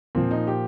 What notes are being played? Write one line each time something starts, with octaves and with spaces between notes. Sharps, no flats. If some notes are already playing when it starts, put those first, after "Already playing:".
A#2 F3 C4
D#4
G4